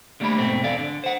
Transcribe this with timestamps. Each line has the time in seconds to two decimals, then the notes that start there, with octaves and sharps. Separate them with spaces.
0.20 D3 G3 A3 A#3 B5
0.38 G#2 B2 A3 C4
0.64 E2 A4 D5 F5
0.78 D3
1.04 C5 F#5